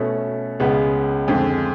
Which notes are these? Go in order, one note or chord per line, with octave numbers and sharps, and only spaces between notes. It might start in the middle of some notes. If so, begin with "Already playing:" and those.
Already playing: B2 A3 C#4
C#2 C#3 G#3 B3
F2 D3 G#3